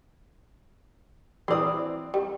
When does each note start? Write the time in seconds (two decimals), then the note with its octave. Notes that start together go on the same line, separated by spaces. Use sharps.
1.48 E3 C4 C5 D5 D#6
2.14 G3